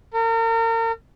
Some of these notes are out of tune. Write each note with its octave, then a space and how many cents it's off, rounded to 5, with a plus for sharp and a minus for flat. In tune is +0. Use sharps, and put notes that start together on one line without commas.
A#4 -40